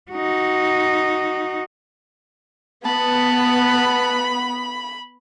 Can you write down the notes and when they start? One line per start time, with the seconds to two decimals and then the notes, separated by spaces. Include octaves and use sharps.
0.11 D#4 F#4
2.85 B3 A5 B5